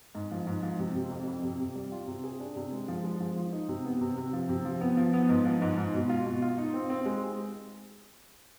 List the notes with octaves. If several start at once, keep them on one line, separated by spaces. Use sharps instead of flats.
G#2
F3
G#2
F3
C3
C3
F2
F2
C3
C3
G3
F4
C3
G#4
D4
C3
G#3
F3
G#3
F3
F3
D#4
C3
B3
C3
C3
F3
C3
F3
B3
F3
B3
G#2
F3
G#2
G#2
B2
F4
B2
F4
D#4
C4
C4
G#3